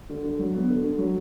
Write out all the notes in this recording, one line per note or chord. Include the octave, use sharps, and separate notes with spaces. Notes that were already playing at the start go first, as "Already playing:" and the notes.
D3
D3
F#3
B3
D3
D3
F#3